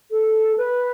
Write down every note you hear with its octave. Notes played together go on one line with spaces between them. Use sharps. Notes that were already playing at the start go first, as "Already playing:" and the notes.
A4
B4